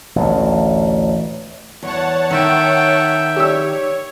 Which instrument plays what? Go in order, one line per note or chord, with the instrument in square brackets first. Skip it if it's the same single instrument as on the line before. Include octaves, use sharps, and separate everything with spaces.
[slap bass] A1 D2
[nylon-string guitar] E2 [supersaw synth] C#5 F#5 A5
[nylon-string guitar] D#3 [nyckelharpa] E5 G5
[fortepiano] G4 E6 [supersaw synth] C#5